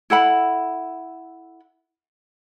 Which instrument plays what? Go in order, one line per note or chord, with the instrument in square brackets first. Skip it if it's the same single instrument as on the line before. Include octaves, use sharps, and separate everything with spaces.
[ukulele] E4 A4 F#5 B5